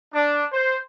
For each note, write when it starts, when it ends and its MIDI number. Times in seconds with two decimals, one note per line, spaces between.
0.14 0.43 62
0.52 0.76 72